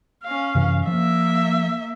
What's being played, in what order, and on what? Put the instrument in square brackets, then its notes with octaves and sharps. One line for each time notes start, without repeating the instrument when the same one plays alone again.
[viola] C#4 F5
[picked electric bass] F#2 C3 E3
[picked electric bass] F3 [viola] A#3 E5